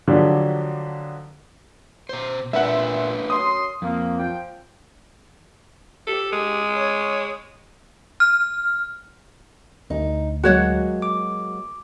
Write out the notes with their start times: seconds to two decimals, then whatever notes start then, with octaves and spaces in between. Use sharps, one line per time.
0.08 D3 F3 F#3 D4 G4
2.09 B2 C5
2.53 A#2 A3 D4 B4 E5 F#5
3.30 F#2 C6 D#6
3.82 F2 A#3
4.18 F3 G5
6.07 G4 A4
6.32 G#3
6.75 C#5
8.20 F6
9.90 D2 D#4
10.43 F#3 G#3 A#3 F#4 C#5 F#5
11.02 D6